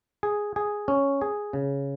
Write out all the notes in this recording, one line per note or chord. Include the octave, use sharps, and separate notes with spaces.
G#4
G#4
C#4
G#4
C#3